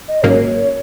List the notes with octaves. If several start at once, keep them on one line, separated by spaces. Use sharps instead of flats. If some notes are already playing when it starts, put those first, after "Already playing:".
D#5
G#1 G#2 F#3 A#3 C#4 C#5